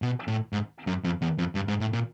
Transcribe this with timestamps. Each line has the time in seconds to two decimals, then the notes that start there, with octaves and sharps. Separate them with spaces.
0.02 B2
0.28 A2
0.53 G#2
0.87 F#2
1.04 F2
1.22 E2
1.38 F2
1.55 G2
1.68 G#2
1.80 A2
1.93 A#2